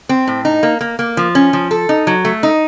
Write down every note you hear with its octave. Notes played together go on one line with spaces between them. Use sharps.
C4
A2
D#4
A#3
A#3
A#3
F3
C#4
F3
A4
D#4
F#3
A3
D#4